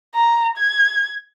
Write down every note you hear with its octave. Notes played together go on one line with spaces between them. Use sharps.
A#5
G#6